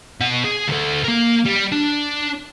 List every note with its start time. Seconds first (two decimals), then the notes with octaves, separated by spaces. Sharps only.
0.21 B2 F#5
0.44 G#4
0.68 D2 A4
1.04 A#3 A#4
1.46 G3
1.72 D4